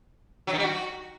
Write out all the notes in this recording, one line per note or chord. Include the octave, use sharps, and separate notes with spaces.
F#3
D#3
G3
F#4